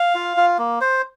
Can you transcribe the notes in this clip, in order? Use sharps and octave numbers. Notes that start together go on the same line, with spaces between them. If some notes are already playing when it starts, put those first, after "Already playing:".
Already playing: F5
F4
F4
A#3
C5